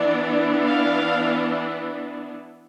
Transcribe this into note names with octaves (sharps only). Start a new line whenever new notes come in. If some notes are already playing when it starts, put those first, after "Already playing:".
Already playing: E3 B3 D4 D5
F5